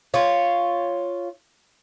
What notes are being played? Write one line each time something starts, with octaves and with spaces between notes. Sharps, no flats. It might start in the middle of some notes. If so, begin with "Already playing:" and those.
F4 C#5